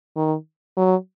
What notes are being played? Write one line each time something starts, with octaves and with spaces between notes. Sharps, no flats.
D#3
F#3